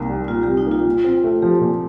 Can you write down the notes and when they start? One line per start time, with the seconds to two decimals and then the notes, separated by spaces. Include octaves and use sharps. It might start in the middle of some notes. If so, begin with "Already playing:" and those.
Already playing: C2 A#3 D#4
0.09 G3
0.28 A#2 F4
0.43 C2 G4
0.57 D#4
0.67 A#3 F4
0.85 A#2
1.04 C4
1.24 A3
1.42 F3 G4
1.61 A#2